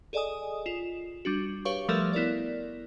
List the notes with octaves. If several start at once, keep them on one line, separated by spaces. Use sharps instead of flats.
G#4 A4 D5 D#5 G#5 D#6
F4 E7
G3 D4 F#4
G4 B4 C#5 F5 C#6
F3 G3 A3 A4 A#4 E5
B3 E4 A#4 D5